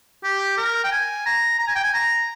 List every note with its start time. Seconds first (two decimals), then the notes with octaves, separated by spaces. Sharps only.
0.24 G4
0.57 A#4
0.84 G5
0.92 G#5
1.26 A#5
1.59 A#5
1.68 G#5
1.76 G5
1.84 G#5
1.94 A#5